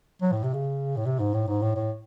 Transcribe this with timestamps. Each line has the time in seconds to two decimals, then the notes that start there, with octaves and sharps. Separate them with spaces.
0.22 F#3
0.32 A2
0.44 C3
0.54 C#3
0.97 A2
1.06 C3
1.20 G#2
1.34 A2
1.48 G#2
1.62 A2
1.76 A2